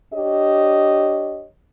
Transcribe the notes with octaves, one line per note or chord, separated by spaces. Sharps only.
D4 G4 C#5 D#5